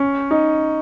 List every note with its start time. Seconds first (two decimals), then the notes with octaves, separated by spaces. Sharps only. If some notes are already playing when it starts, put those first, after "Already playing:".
Already playing: C#4
0.31 D#4